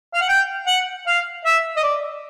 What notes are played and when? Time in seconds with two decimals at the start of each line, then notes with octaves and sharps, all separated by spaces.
0.14 F5
0.21 F#5
0.29 G5
0.67 F#5
1.07 F5
1.46 E5
1.77 D#5
1.83 D5